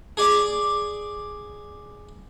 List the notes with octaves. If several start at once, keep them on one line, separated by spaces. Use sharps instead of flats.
G#4 D5 D6